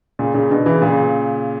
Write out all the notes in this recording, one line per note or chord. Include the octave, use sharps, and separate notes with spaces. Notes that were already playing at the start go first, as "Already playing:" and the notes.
A#2 C#3
A#2 C#3
B2 D3
C#3 E3
A#2 C#3